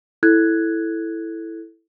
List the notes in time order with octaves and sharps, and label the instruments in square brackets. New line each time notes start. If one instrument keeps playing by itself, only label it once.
[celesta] E4 A4 F#6 G#6